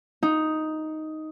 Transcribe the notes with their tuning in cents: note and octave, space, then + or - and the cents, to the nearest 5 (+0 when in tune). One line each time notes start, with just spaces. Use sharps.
D#4 +5